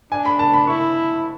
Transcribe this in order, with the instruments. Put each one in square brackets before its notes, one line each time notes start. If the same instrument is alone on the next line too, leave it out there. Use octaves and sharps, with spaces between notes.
[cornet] D4 [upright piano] G#5
[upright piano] B5
A5
B5
[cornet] E4 [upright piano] C#6